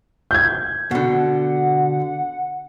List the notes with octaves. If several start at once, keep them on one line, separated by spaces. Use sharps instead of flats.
G6 G#6
B2 D3 F#5